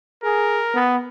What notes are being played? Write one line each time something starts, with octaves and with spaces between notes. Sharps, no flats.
G#4 A#4
B3